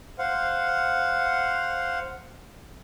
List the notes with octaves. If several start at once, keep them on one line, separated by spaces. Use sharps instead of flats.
C5 F5 F#5